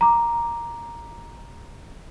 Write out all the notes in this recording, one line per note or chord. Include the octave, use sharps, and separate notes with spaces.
A#5 D6